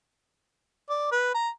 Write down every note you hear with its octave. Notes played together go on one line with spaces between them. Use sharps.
D5
B4
A#5